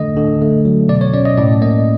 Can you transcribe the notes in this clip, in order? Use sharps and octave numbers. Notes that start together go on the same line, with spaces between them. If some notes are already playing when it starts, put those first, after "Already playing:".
Already playing: D3 A3 D#5
D3
A3
F#3
B2 D5
C#5
C#4 D5
D#5
A2 D5
A#3 D#5